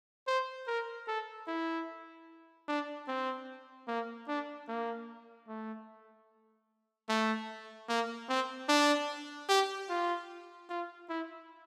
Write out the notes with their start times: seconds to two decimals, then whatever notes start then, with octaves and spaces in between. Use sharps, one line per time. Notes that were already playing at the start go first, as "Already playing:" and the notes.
0.27 C5
0.67 A#4
1.07 A4
1.47 E4
2.68 D4
3.08 C4
3.88 A#3
4.28 D4
4.68 A#3
5.48 A3
7.09 A3
7.89 A#3
8.29 C4
8.69 D4
9.49 G4
9.89 F4
10.69 F4
11.09 E4